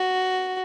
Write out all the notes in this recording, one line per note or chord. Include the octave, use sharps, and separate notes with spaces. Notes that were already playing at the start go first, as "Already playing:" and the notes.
Already playing: F#4